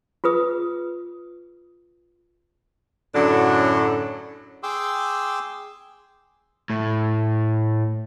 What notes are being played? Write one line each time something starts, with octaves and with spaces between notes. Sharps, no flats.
F4 G#4 B4 D#6
F#2 A2 D3 F#3 D4
G#4 G5 C6 D6 E6
A2